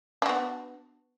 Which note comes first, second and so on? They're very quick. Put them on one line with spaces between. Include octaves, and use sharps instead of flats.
D4 F#4 B3